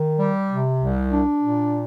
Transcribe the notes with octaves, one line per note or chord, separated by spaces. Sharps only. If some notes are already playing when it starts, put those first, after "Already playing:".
Already playing: D#3
G3
C3
C2
D4
A#2